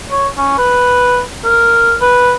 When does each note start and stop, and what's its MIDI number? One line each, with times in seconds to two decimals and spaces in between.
0.11 0.28 73
0.37 0.57 61
0.58 1.22 71
1.45 1.95 70
2.01 2.34 71